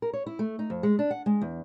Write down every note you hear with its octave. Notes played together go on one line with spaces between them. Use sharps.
A#4
C#5
E4
A3
D#4
F2
G#3
D4
F#5
G#3
E2